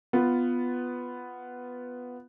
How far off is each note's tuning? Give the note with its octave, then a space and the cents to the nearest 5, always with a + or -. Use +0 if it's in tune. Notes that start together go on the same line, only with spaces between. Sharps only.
B3 +5 F4 +0